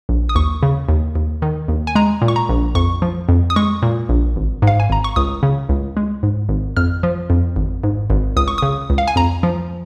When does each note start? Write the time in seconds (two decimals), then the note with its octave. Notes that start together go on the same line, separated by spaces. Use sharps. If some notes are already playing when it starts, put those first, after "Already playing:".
0.09 A#1
0.29 D#6
0.35 D#2 C#6
0.63 C#3
0.89 D#2
1.15 D#2
1.42 D#3
1.68 D#2
1.87 G#5
1.95 G#3 A#5
2.22 A#2
2.28 C#6
2.36 A#5
2.49 A#1
2.75 F2 C#6
3.02 F3
3.29 F2
3.50 D#6
3.56 G#3 C#6
3.82 A#2
4.09 A#1
4.36 G#1
4.62 G#2
4.67 F5
4.80 G#5
4.90 G#1 A#5
5.04 C#6
5.16 C#2 D#6
5.43 C#3
5.69 C#2
5.97 G#3
6.23 G#2
6.49 G#1
6.77 F2 F6
7.03 F3
7.30 F2
7.56 G#1
7.84 G#2
8.10 G#1
8.37 C#2 D#6
8.48 C#6
8.58 C#3 D#6
8.90 C#2
8.98 F5
9.08 G#5
9.16 F2 A#5
9.43 F3